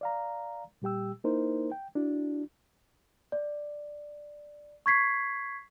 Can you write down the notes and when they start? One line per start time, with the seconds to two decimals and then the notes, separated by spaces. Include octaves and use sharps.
0.01 D5 F5 A#5
0.82 A#2 G3 G4 G5 E6
1.24 A#3 D#4 E4 A#4 C5
1.72 G5
1.95 D4 E4 F#4
3.32 D5
4.86 C#6 G#6 B6 C7